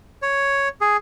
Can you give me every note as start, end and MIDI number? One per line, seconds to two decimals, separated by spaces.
0.22 0.68 73
0.81 0.97 68